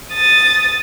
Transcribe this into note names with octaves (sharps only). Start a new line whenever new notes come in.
D#6 A6